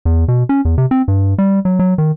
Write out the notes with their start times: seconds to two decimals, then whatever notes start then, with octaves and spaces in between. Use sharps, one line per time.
0.05 E2
0.28 B2
0.49 C#4
0.65 E2
0.78 C3
0.91 C4
1.08 G2
1.38 G3
1.65 F#3
1.79 F#3
1.98 D#3